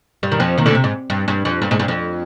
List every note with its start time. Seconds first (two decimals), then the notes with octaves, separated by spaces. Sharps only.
0.23 G2 G3
0.32 D#3
0.40 F2 F3
0.58 D#2 D#3
0.66 D2 D3
0.75 C3
0.84 G#2
1.10 G2
1.28 G2
1.45 F2
1.62 G2
1.71 G#2
1.79 G2
1.88 F2